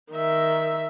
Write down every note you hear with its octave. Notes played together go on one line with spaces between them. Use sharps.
D#3 E5